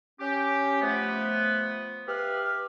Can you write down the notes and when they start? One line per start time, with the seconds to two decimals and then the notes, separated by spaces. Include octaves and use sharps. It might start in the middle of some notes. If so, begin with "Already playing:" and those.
0.20 C#4 G4
0.82 F3 A3 B3
2.08 G4 B4 E5 F5 F6